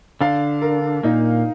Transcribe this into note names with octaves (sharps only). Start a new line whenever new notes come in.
D3 D4 F5
A#4
A#2 A#3 D#4